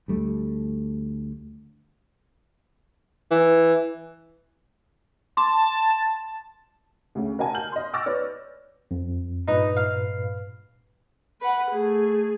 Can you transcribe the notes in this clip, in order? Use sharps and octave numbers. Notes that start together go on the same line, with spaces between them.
D2 G3 A3
E3
A5 C6 D6
D2 C#3
A#4 D#5 F#5 G#5 A5
F6 G6 F#7
D#5 C6
C#6 D6 E6 F6 A6 A#6
B4 C#5 D5
F2
G2 A#2 D#4 B4
F5
B4 F#5
A3 G#4